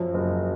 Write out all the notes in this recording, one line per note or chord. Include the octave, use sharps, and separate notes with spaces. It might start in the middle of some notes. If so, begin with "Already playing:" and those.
Already playing: F#2 F3
F#1